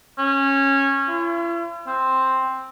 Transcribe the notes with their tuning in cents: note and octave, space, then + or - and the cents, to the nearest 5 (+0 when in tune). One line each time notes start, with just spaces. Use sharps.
C#4 -15
E4 +45
C4 +5